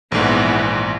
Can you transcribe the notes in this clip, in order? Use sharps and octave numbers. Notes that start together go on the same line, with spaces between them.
A#1 G#2 E3 B3